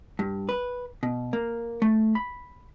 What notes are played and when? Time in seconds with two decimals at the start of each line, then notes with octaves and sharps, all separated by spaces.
0.19 G2
0.49 B4
1.03 B2
1.33 A#3
1.82 A3
2.15 B5